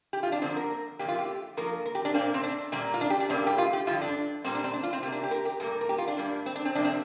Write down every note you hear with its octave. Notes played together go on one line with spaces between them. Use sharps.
G4
F4
D4
G2 D3 F3 A#3 C4
A#4
F2 D3 A#3 G4
F4
G4
G2 F3 A#3 A#4
A#4
G4
D4
A#2 A#3 C4
C4
D4
A#2 G3 A#3 C4
F4
D4
G4
D4
G2 G3 A#3 C4
G4
F4
G4
G2 D3 F3 F4
D4
A#2 G3 A#3 C4
D4
C4
D4
F4
C4
C3 A#3 G4
D4
G4
A#4
G4
G2 G3 A#3 A#4
A#4
G4
F4
D4
G2 G3 A#3
C4
D4
C4
F2 C3 A#3 D4
C4